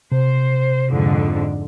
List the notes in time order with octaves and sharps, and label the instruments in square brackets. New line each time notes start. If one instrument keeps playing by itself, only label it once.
[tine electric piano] C3 [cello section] C5
[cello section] F2 G#2 D3